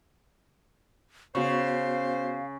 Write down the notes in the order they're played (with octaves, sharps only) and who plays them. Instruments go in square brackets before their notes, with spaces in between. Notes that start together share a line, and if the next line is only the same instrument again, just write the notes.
[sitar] C#3 [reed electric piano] B3 F#4 C#6 [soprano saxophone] C5 [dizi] F5